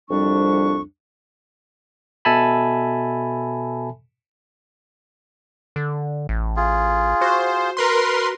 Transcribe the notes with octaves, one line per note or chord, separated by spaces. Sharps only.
C2 F2 G3 D4 C#6
B2 A4 E5 G#5 A5 B5
D3
A1
F4 G#4
F#4 C5
A#4 B4 C6